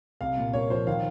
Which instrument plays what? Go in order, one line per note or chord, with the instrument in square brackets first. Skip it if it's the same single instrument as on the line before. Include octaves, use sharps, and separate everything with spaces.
[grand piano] C2 [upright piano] F5
[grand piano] A#2
[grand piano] A#3 [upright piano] C#5
[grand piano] F3 [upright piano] C5
[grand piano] D#3 [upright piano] F5